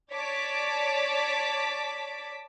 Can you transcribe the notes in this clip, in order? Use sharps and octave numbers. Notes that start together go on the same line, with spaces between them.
C#5 D5 A5 D6 B6